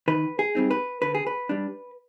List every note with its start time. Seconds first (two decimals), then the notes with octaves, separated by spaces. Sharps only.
0.08 D#3 B4
0.39 G#4
0.55 G3 C4 D#4
0.71 B4
1.02 D3 B4
1.15 G#4
1.27 B4
1.49 G3 D4